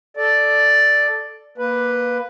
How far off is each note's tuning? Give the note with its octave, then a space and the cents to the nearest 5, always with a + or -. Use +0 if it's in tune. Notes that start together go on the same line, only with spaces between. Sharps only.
A4 -5 D5 +0
A#3 +20 B4 +0